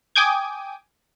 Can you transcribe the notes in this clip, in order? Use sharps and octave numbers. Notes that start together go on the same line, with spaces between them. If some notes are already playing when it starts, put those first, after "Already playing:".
G5 G#5 D6 D#6 G6 G#6